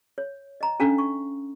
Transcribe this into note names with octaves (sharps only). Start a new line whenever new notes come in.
C#5
D#5 A#5
C#4 D4 A4 F5 A#5
C#6